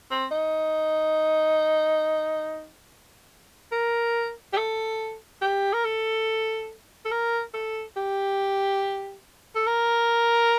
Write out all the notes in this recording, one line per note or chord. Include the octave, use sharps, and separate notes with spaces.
C4
D#4
A#4
G4
A4
G4
A#4
A4
A4
A#4
A4
G4
A4
A#4